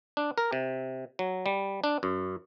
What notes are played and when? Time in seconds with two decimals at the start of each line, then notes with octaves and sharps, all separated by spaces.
0.17 D4
0.38 A#4
0.53 C3
1.19 F#3
1.46 G3
1.84 D4
2.03 F#2